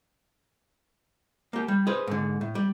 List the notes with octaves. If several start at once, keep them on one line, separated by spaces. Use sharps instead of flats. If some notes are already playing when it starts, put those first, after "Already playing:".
A#3 G4
G3
G#4 B4 C5
G#2 D3
A2
G3